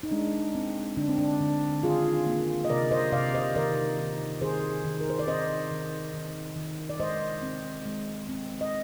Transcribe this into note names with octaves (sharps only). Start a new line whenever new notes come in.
D#4
G#3 D4
C4
D3 D4
C4
D4
D3
D#3 F4 G#4
A#3
D#5
C3 A#4 D5
C5 D#5
C3 D5 F5
C5 D#5
D#3 A#4 D5
D#3
D#3 G#4 C5
D#3
A#4
C5
D5
C4 C5 D#5
D#3
D#3
D#3
D5
G#3 C5 D#5
C4
G#3
C4
D#5